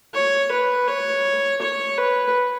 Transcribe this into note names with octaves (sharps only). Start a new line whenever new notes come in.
C#5
B4
C#5
C#5
B4